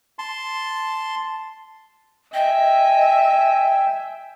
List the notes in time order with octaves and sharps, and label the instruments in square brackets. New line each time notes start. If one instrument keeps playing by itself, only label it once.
[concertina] A5 C6
[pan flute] D#5 [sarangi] E5 [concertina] G5 [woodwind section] G#5